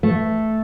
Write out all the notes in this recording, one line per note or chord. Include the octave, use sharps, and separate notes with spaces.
A3